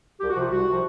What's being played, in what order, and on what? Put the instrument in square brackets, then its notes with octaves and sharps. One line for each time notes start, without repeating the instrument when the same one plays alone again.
[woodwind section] C2 G4
F#4
C3 F3 F4
C2 F#4
C3 F3